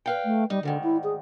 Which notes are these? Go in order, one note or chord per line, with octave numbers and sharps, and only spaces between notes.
B4 F5 G5
A3
G3 D#4
D2 G#2 D3 D#3
E4
G#4